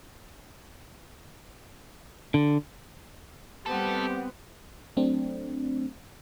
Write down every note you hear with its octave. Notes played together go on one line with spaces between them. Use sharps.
D3
G3 A3 B3 C4 G4 A4
F#3 A3 C4 D4